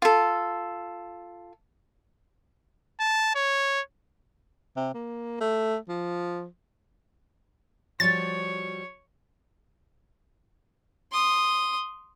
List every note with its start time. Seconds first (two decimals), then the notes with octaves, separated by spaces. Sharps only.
0.02 F4 A4
3.00 A5
3.35 C#5
4.77 C3
4.94 A#3
5.41 A3
5.89 F3
8.00 F3 G3 F#4 C#5 A6
11.12 C6 D#6